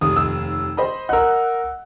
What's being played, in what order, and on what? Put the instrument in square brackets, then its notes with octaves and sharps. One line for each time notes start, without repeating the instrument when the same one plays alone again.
[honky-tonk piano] F1 D#2 [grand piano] D#6
[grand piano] E6
[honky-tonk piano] C5 D#5 B5
[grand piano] A#4 D#5 [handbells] F#5 E6 [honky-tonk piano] F#6